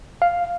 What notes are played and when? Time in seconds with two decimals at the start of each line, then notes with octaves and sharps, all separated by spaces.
0.22 F5